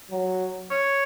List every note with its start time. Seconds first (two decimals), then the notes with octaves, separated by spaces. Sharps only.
0.11 F#3
0.71 C#5